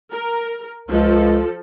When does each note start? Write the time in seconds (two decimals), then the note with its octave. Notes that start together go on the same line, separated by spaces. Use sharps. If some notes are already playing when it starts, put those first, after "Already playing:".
0.12 A#4
0.89 C#2 F3 A4